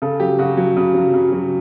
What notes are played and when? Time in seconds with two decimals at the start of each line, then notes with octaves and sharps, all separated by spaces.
0.02 C#3 A4
0.20 F#3 G4
0.39 C#3 F#4
0.57 F#3
0.77 C#3
0.94 F#3
1.14 C#3
1.32 F#3